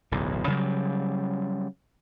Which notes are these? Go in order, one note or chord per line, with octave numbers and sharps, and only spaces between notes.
D1 B1 E2
C#3 F#3 G3